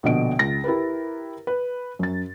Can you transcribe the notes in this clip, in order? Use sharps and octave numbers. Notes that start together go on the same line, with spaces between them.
A#1 B2 D3 D#5 D7
C#2 A6 A#6
E4 G4 A#4 B4
B4
F#2 A6